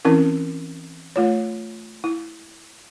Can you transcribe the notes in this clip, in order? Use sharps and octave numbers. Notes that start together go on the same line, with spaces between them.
E3 C4 C#4 E4 A#4
A3 F4 C#5
E4